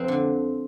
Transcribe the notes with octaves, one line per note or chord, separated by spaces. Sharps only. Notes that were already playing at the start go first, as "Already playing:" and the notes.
Already playing: F2 C4
D3